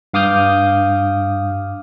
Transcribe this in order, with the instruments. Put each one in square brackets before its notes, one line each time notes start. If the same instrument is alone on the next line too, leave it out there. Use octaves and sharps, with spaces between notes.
[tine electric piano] G2 F5 D6 D#6 F6 G6